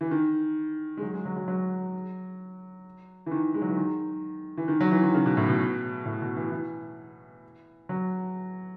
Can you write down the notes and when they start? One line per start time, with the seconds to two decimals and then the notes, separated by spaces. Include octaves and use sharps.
0.01 E3
0.11 D#3
0.97 G#3
1.02 F#3
1.14 G#3
1.25 F#3
1.36 F#3
1.48 F#3
3.26 E3
3.31 D#3
3.54 G#3
3.62 F#3
3.69 E3
3.77 D#3
4.57 E3
4.68 D#3
4.81 F#3
4.91 E3
5.03 D#3
5.14 C#3
5.26 B2
5.37 A2
5.49 B2
6.05 A2
6.22 B2
6.37 E3
6.51 E3
7.89 F#3